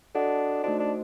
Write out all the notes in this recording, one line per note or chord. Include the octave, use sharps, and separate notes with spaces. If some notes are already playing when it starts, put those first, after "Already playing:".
D4 F#4 A4 D#5 F#5
A3 D4 D#4 F#4 C5 D#5
D4